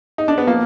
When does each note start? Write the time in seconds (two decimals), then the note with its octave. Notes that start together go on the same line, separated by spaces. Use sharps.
0.18 D#4
0.28 D4
0.38 B3
0.47 F3 A#3